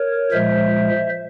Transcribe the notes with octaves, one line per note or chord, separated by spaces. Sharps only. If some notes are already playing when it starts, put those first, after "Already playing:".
Already playing: A#4 C#5
A#2 F3 G#3 C5 E5